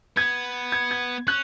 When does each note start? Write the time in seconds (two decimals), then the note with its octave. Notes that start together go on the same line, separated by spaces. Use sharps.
0.17 B3 G#6
0.72 G#6
0.91 G#6
1.27 C#4 F#6